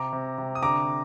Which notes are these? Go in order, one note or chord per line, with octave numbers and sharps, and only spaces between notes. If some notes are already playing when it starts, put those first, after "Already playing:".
Already playing: C3 A#5 D6
C3
C3
D#6
D3 A#5 D6